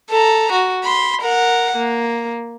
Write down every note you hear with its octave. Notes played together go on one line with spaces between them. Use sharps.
A4 A#5
F#4
B5 C6
A#4 F#5
A#3